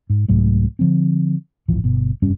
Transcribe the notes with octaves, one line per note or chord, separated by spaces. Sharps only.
G#2
C2 G#2 F#3 A3
D3 F3 C4
D1 G#1 E3 F3
G1 B2
F1 G2 G3 C#4